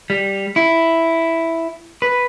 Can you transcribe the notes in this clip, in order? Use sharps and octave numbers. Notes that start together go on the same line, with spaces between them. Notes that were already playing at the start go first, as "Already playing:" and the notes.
G3
E4
B4